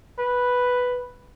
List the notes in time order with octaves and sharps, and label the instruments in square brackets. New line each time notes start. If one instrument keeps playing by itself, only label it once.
[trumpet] B4